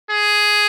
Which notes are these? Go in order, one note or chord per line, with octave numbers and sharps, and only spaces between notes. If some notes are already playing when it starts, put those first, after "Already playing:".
G#4